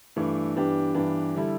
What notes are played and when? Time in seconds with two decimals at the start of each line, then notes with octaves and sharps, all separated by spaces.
0.16 G2 E3 A3 D4
0.56 G2 E3 B3 D4 G4
0.95 G2 E3 B3 D4 G4
1.35 D3 G3 E4 A4